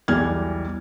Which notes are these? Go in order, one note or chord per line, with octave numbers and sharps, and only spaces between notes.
B1 E2 E3 G3 F6 G#6